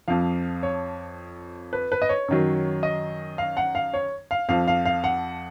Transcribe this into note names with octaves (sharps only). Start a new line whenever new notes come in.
F2 F3 F5
C#5
B4
B4
D#5
C#5
F#2 D#3 F#3
D#5
F5
F#5
F5
C#5
F5
F2 F3 F5
F5
F5
F#5